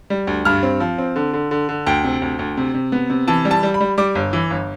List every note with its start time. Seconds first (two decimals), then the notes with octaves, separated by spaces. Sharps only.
0.10 G3
0.27 D2
0.45 G2 F6
0.63 C4
0.80 F3
0.98 C4
1.16 D3
1.33 D3
1.51 D3
1.69 D3
1.87 D2 G5
2.04 C3
2.22 D2
2.39 D2
2.57 C3
2.74 C3
2.92 B3
3.10 C3
3.28 E3 A5
3.45 G3
3.51 A5
3.63 G3
3.74 B5
3.80 G3
3.98 G3 D6
4.15 G1
4.33 E3
4.50 G1